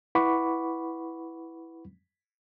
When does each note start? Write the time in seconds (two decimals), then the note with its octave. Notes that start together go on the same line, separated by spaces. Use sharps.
0.15 E4 B4 F#5 B5 C#6 D6